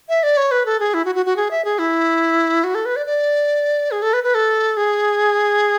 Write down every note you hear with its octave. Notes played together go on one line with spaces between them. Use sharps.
E5
D5
C#5
B4
A4
G#4
E4
F#4
F#4
F#4
G#4
E5
G#4
E4
F#4
A4
B4
D5
D5
G#4
A4
B4
B4
A4
G#4